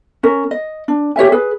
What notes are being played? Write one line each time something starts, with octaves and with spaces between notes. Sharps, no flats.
C#4 A#4
D#5
D4
G4 C#5 E5 G#5
G#4 B4